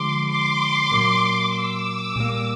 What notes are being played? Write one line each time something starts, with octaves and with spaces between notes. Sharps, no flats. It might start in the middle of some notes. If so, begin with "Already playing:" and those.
Already playing: D3 F3 G#3 C6 D6
C6 D6
A#2 F#3 A#3
D6 E6
A#2 G3 A#3